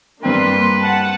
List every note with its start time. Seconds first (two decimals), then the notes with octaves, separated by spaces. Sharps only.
0.23 G2 A#3 C4 D4 B4 G5 C6
0.80 F#5 A5